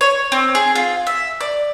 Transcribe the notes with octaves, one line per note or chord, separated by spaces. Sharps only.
C#5
C4
G#4
F4
E5
D5